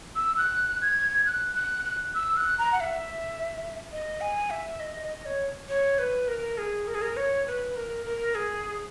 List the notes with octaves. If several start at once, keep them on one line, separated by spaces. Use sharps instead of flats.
E6
F#6
G#6
F#6
F#6
F#6
E6
F#6
A#5
F#5
E5
D#5
G#5
E5
D#5
D#5
C#5
C#5
B4
A#4
G#4
A#4
G#4
A#4
C#5
B4
A#4
A#4
G#4